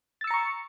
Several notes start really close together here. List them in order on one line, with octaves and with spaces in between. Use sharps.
A6 E6 C#7 A#5 C#6